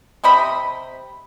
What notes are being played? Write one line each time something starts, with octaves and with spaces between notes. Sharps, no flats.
C3 C4 D#5 B5